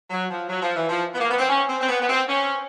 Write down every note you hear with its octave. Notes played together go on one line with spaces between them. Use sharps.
F#3
F3
F#3
F3
E3
F3
B3
A#3
B3
C4
C#4
C4
C4
B3
B3
C4
C#4